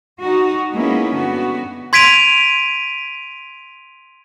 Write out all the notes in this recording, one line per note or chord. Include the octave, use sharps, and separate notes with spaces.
D#4 F#4
G#3 A#3 B3 C#4 D#4 E4
G2 D3 B3 F#4
C6 G#6 B6 D7 D#7 F7